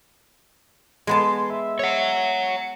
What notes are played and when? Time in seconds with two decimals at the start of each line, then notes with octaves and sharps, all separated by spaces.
1.07 G#3 B3 A5 C6
1.50 E5
1.79 C#5 F#5
2.42 C#7